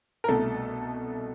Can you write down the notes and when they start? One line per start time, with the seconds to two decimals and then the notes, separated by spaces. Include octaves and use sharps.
0.24 A#4
0.28 C2 B2 A3 A4